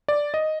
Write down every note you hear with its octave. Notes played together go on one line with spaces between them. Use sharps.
D5
D#5